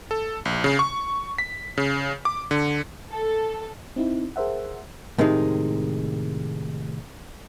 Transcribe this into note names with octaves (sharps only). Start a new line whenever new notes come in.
A4
A#1
C#3
C#6
B6
C#3
D6
D3
A4
C4 D#4 E4
G#4 A#4 C5 E5 F#5
A2 C3 D#3 G#3 D4 D#4